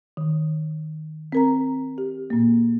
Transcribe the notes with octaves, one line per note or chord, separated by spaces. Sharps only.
D#3
C4 A#4 A#5
G4
A#2 A#3